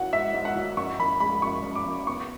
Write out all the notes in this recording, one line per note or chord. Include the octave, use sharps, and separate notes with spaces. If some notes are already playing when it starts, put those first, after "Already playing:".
Already playing: F#3 C#4 E4 F#5
G#2 E5
G#2
F#5
F#3
F#2 C#6
F#2 B5
G#3 B5
F#2 C#6
F#2
D6
F#2
B3 C#6